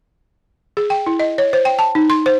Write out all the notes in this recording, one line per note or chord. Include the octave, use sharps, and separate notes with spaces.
G#4
G5
E4
D#5
C#5
C5
G5
A5
D#4
C6
C5